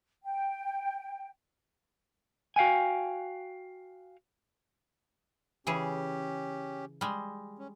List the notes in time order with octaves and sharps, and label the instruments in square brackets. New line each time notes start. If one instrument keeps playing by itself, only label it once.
[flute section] G5
[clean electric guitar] F#4 F5 G5 G#5
[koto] C#3 E3 G#4 [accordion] C#4 G4
[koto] G3 G#3
[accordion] C#4